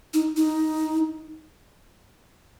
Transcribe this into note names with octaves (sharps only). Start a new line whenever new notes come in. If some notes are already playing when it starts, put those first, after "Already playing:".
D#4
D#4